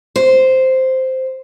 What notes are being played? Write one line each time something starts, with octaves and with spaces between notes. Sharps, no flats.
C5